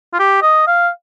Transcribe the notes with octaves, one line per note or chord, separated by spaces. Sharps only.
F4
G4
D#5
F5